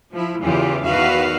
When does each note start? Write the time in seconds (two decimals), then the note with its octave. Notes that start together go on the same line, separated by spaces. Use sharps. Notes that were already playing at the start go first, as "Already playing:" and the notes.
0.13 F3 E4
0.42 E2 C#3 E3 F4 G4
0.84 E2 D#3 F#4 B4 E5 F5